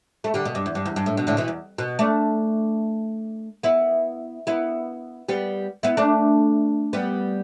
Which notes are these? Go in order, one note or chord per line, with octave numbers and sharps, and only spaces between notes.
A3
D3 G3
B2
G2
E2
G2
E2
G2
A2
B2
A2 D3
B2 E3
E2
B2
A3 D4
B3 E4
B3 E4
G3 B3
B3 E4
A3 D4
G3 B3